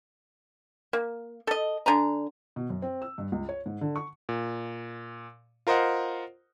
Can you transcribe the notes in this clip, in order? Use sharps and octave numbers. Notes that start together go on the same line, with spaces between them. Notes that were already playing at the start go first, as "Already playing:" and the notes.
A#3
A4 D#5
D3 G#5 A#5
B2
F#2
C4
E6
G2
C#2
C#5
G#2
D3
C#6
A#2
F4 A#4 C5 D#5 F#5